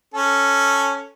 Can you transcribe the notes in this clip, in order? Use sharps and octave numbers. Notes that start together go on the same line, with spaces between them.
C#4 A4